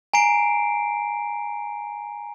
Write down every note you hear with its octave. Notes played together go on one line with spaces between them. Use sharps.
G#5 A#5 C7 D7